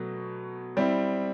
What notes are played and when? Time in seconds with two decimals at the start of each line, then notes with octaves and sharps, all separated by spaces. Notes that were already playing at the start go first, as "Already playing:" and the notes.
Already playing: B2 F#3 A3
0.77 G3 C4 E4